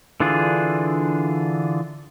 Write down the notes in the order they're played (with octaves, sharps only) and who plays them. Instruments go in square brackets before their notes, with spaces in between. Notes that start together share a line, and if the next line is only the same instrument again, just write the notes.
[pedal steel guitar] D3 E3 D4 F4 G#4